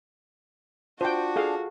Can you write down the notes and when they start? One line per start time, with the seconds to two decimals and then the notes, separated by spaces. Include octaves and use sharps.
1.01 D4 F4 F#4 C5 G5
1.36 G#4 A4 F5